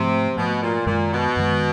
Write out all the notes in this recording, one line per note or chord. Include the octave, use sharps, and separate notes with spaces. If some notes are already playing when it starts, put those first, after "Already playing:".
Already playing: G#2 C3 F3 A3
G#2 B2 F3 A3
A#2
F#2 A#2 D#3 G#3
B2
F#2 D#3 G#3